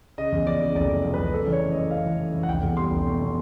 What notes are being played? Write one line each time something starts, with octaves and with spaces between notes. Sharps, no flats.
C#3 D#5
E2
F3 D5
C#3
F1 D5
E2
F3
F1 B4
C#3 A4
E3 D5
C#5
F#2
E3 D#5
C#3 F5
E3
F#2
E3
F#5
F1 G5
E2
G3 C6
F1
B2
B2